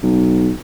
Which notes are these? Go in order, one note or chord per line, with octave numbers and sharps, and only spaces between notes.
B1